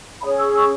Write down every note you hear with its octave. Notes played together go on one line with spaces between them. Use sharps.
C#4 G#4 C#5 B5 D#6
C#6 E6
C#6 E6